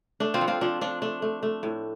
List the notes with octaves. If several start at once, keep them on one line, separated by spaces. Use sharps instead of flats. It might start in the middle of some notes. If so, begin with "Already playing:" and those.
A3 D4
C4 F4
F3
C4 F4
F3 D4
F3 D4
A3 D4
A3
A3
A2